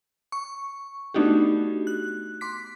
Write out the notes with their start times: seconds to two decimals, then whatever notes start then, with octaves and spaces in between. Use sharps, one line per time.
0.32 C#6
1.14 A3 B3 D4 D#4 F#4 G4
1.87 F#6
2.41 C6 D6 B6